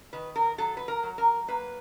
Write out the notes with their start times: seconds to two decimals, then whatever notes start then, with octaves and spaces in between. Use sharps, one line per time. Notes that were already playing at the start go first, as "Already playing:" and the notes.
0.13 D#3 B4
0.36 A#4
0.58 F#3 A4
0.77 B4
0.88 A#4
1.03 F#3
1.18 A#4
1.48 A#3 B4